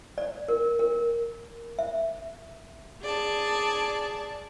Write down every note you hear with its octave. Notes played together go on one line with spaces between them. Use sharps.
D5
A#4
A#4
E5
G#4 D5 A5